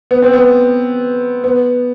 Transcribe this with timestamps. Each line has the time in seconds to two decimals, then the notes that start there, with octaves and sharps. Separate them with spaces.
0.11 B3
0.22 C4
0.33 B3
1.44 B3